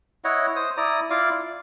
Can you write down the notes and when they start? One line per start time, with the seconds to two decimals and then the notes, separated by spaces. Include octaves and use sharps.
0.24 E4 C#5 D#5 F#5
0.56 C5 D#6
0.77 E4 D5 A#5 D#6
1.10 E4 F4 D5 F5
1.32 D5